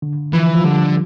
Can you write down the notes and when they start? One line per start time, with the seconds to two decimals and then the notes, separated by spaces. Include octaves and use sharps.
0.02 D3
0.33 E3 F3
0.55 F3
0.64 D3 G3